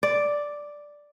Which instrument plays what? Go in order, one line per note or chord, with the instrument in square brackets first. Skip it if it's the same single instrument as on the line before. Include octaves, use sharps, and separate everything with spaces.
[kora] D5